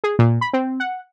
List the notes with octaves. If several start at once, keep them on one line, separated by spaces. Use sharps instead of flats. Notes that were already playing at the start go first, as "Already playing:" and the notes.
G#4
A#2
B5
C4
F#5